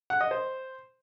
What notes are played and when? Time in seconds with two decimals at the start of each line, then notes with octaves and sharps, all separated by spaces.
0.10 F#5
0.21 D#5
0.31 C5